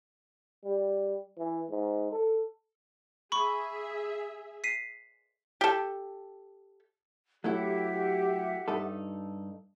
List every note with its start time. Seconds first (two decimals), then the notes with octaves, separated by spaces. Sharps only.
0.64 G3
1.38 E3
1.70 G#2
2.12 A4
3.32 G#4 E5 B5 C#6
4.64 B6 C7 D#7
5.61 G4 A4
7.44 F#3 A3 E4 G4 E5 F#5
8.68 G2 D#4 A4